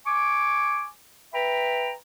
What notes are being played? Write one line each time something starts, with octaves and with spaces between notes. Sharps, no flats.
G#5 C#6 D6
B4 E5 G5 A#5 B5